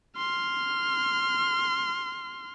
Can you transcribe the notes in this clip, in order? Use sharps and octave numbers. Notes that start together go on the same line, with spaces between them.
C6 F6